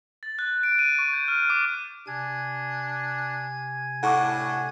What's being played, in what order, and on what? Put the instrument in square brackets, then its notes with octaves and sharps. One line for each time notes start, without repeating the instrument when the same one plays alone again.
[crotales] A6
F#6
D7
D#7
C#6
G6
F6
D6
[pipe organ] C3 G#5 G#6 [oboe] D4
[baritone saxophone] A2 [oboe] D4 [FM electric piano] F#5 C#6 D6